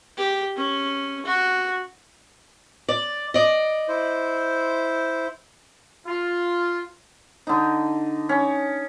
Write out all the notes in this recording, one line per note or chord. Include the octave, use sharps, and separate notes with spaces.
G4
C#4
F#4
D5
D5 D#5
E4 C5
F4
D3 D#4
C#4